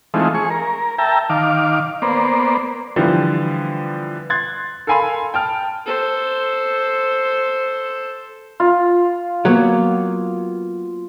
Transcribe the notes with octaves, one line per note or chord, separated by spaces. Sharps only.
E3 G#3 A3 C4 D#4 F4
G#4 C#6
A#4
E5 G5 A5 A#5
D#3 F5 D6
A#3 B3 C5 D5
D3 E3 F3 G3 B3
C6 F#6 G#6 A6
A4 A#4 F5 G#5 B5 C6
G5 A5 F6
A4 C5
F4
F#3 A#3 B3 C#5